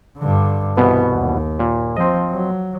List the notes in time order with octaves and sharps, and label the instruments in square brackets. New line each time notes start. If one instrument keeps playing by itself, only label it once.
[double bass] G2 D3
[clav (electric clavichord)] C2 B2 E3 [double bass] B3
[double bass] D#2
[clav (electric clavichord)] A#2
[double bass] F3 [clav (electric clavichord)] C4 D#5
[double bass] F#3